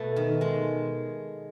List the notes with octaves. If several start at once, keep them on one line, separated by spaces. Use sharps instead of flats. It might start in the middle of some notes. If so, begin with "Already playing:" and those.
Already playing: B2 A3 B3
D#3
G#3